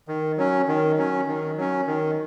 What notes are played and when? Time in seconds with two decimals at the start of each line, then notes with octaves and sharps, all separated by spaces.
0.08 D#3
0.38 F#3 C#4
0.68 D#3
0.97 F#3 C#4
1.27 D#3
1.57 F#3 C#4
1.87 D#3